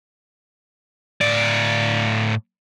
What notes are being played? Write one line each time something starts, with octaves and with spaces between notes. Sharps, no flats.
A2 D5